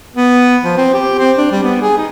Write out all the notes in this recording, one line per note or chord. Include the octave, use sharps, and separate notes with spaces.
B3
F3
C4
G4
C4
D4
G3
B3
G#4
D#4